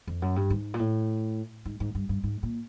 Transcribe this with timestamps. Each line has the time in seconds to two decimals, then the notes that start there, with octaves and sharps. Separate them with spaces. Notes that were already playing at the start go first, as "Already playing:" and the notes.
0.07 F2
0.22 F#2
0.36 G2
0.50 G#2
0.74 A#2
0.79 A2
1.65 G#2
1.80 G#2
1.95 G2
2.09 G2
2.23 G#2
2.43 A#2